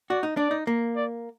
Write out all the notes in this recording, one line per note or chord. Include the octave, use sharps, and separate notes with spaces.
F#4 D5
D#4
D4 D5
D#4
A#3
D5